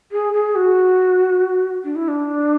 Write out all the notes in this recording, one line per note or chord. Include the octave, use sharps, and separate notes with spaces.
G#4
G#4
F#4
D4
E4
D4